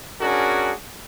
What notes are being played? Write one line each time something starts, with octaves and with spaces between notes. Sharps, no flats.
C#4 D4 F#4 G#4 A#4